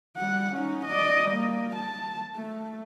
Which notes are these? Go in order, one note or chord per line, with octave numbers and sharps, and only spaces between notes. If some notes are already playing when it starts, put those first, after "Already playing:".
G3 F#5
C#4 D#4
D5 D#5
G3 A#3
A5
A3